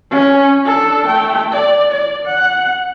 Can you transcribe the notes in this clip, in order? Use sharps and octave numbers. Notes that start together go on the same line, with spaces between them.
C#4
D4 A4
A3 G5
D5
D5
F#5